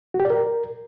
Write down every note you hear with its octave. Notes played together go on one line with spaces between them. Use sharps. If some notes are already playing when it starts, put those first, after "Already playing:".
F#4
G4
D5
A#4